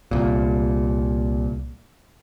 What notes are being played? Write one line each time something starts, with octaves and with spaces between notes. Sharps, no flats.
C2 A#2